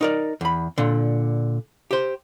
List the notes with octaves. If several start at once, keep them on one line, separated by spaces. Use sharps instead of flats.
D#4 A#4 D5
E2 B5
A#2 D3
G4 C5